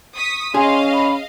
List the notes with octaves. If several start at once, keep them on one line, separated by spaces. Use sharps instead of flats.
C#6 D#6 B6
C#4 G#4 D#5 F5 C6
B5